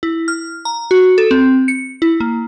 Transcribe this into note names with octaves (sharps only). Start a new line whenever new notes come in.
E4
F6
A#5
F#4
A4
C4
C#7
E4
A#3